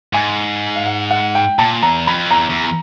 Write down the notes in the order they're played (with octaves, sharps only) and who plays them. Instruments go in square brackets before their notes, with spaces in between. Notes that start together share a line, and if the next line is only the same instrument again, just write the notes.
[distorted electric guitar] G#2 [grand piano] G#5
[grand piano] F5
F#5
F#5
G5
[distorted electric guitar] A#2 [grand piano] A5
[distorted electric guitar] E2 [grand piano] A#5
[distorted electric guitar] F2 [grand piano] B5
[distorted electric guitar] E2 [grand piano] A#5
[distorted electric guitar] E2